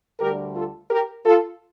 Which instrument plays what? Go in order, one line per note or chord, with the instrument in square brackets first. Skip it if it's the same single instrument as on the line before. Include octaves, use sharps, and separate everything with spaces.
[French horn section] D2 D3 G3 D4 G4 A#4
F4 A4
G4 A#4
F4 A4